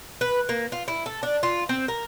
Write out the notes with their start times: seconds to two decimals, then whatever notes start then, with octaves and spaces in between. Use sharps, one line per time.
0.21 B4
0.49 A#3
0.72 F4
0.88 E4
1.06 A4
1.23 D4
1.43 F4
1.69 C4
1.88 A#4